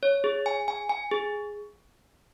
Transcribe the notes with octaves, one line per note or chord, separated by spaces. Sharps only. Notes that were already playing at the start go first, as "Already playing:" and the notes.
C#5
G#4
G#5
G#5
G#5
G#4